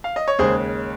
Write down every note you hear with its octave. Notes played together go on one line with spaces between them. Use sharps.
F5
D#5
C#5
D#2 C#3 G#3 G#4 C5